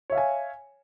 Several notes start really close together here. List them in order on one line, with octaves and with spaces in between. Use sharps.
C#5 E5 F5 G#5